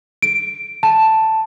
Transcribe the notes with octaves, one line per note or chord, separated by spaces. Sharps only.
D7
A5